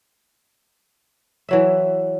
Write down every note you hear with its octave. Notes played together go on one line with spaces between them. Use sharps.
E3 F#3 E5